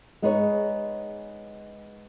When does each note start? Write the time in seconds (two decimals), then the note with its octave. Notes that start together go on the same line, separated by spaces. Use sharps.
0.22 G#3 B3 D#4 G#4 B4 C#5